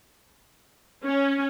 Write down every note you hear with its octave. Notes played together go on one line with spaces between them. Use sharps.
C#4